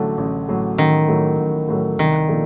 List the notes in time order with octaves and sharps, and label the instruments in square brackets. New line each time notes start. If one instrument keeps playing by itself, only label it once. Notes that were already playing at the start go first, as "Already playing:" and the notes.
Already playing: [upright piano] A1 A2 F#3 A3 [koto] D3
[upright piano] A1
A2 F#3 A3
[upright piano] A1 [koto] D#3
[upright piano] A2 F#3 A3
A1
A2 F#3 A3
[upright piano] C2 [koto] D#3
[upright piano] A#2 F3 A3 D4